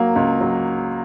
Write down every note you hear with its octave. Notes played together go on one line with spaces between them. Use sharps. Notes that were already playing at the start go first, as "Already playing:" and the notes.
Already playing: F#3 A#3
C#2
F#3